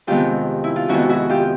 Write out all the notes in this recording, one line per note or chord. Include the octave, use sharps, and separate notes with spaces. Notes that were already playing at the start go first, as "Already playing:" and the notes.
F2 C3 D#3 G#3 B3 F4 G4
E4
F4
F2 C3 D#3 G#3 B3 E4 F#4
E4 F#4
F4 G4